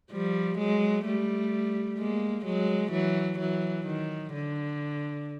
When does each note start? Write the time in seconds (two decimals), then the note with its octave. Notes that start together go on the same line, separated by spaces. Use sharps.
0.12 F3 G3
0.58 F#3 G#3
1.06 G3 A3
1.98 G#3 A#3
2.45 F#3 G#3
2.92 E3 F#3
3.39 E3 F#3
3.86 D#3
4.33 D3